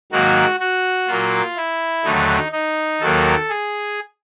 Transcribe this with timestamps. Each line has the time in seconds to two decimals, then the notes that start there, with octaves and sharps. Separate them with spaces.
0.12 G#2 D#3 F#3 A#3 F#4
0.60 F#4
1.07 A#2 F#3 A#3 F4
1.57 E4
2.04 D#2 D3 F#3 A3 D#4
2.52 D#4
3.01 D#2 D#3 F#3 A#3 A4
3.49 G#4